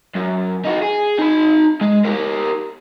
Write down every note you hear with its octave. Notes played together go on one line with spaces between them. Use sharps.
F#2
D#4 F#4
G#4
D#4 B5
G#3
G4 A#4